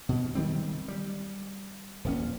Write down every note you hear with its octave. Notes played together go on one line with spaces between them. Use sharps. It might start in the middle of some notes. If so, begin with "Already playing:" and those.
B2
D#3 G3 C4
G3
D#1 A#1 C#4